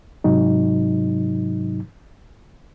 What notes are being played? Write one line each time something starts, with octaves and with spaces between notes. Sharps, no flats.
G#2 C3 F#3 D#4